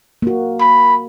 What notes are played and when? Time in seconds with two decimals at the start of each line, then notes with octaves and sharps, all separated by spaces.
0.22 A#3 F#4
0.61 B5